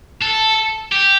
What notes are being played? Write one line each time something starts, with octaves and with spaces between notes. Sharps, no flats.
A4
G4